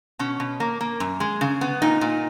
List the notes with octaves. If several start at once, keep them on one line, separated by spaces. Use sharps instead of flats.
B2 C#4
B2
A#3
A#3
F#2
G#3
C#3
B3
A#2 D#4
A#2